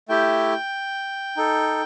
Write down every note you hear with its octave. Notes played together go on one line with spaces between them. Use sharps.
A3 E4 G4 G5
D#4 A4